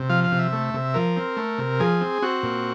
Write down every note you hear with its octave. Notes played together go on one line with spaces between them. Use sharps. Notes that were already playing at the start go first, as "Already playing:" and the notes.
Already playing: C3
F3 F5
F5
C3
E5
A3
C3
F3 A#4
C4
A3
C3
F3 G#4
C4
C4 F#4
A#2